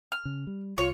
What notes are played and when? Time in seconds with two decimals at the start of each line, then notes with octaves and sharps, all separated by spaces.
0.12 F6
0.25 C#3
0.47 G3
0.78 C2 F4 C#5